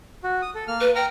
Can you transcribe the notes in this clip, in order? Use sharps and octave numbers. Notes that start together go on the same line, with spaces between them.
F#4
D#6
A4
A#3 F6
B4
G5 A#5 F6